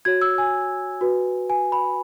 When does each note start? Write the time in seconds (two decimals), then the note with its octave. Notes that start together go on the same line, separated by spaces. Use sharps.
0.05 F#4 C#5 G#6
0.21 E6
0.38 G#5
1.01 F#4 B4
1.50 G#5
1.72 B5